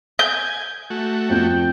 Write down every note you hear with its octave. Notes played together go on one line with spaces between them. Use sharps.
G#5 G6
A3 F#4
F2 G5